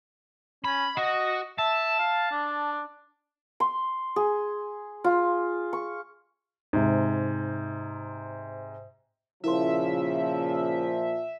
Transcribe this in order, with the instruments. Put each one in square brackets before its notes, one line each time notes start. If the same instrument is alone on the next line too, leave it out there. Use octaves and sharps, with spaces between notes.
[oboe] C#4 [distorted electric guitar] B5
[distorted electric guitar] F#4 [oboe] D#5
[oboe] E5 [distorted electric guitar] A5
[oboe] F5
D4
[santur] C6
G#4
F4
C#6
[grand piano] G#2 C3
[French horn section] A#2 F3 [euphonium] C#3 [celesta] E4 A#4 C6 [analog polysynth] E5